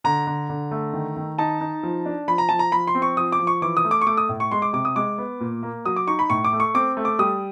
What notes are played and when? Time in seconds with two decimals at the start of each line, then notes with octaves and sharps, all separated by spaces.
0.04 D3 A#5
0.27 D3
0.49 D3
0.71 A3
0.93 D#3
1.17 D#3
1.38 D#4 A5
1.61 D#4
1.83 F3
2.06 D4
2.28 F3 B5
2.38 A#5
2.49 F3 A5
2.59 A#5
2.72 F3 B5
2.87 C6
2.95 C4
3.02 C#6
3.17 F3 D#6
3.32 D6
3.40 F3
3.47 C#6
3.62 E3 D6
3.77 D#6
3.85 A3
3.91 D6
4.01 C#6
4.07 A3 D6
4.17 D#6
4.29 A2
4.40 C#6
4.52 G#3 C6
4.62 D6
4.73 C3 D6
4.85 D#6
4.96 G#3 D6
5.18 B3
5.40 A#2
5.63 A#3
5.85 F#3 D#6
5.96 D6
6.08 D#4 C#6
6.19 B5
6.30 A2 C#6
6.45 D6
6.53 A3
6.60 C#6
6.75 C4 D6
6.97 A3
7.05 D6
7.19 G3 D#6